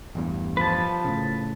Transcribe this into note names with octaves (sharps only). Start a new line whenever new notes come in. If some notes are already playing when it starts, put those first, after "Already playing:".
A1 E2 G2
F3 B4 A5
A2 C#3